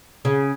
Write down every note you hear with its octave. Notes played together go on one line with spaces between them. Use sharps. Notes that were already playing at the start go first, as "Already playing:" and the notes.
C#3